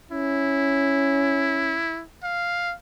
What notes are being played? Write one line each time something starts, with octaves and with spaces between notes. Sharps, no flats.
C#4 E4
F5